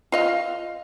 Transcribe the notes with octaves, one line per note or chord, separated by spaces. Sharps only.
F4 D#5 F5